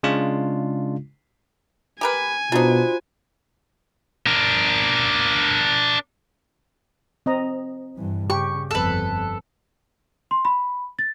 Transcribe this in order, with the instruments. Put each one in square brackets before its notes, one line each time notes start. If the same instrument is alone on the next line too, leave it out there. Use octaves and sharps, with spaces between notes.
[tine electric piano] C#3 G#3 D4 F4
[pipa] G4 A#4 B4 [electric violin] G#5
[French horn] B2 [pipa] D4 D#4 [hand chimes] F4 F#4 C5
[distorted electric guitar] D4 A#4
[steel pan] C4 D#5 A#5
[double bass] G2 E3
[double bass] C#3 [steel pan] G4 [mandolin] C#6
[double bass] G1 F2 [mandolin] A4 B4
[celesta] C6
B5
A6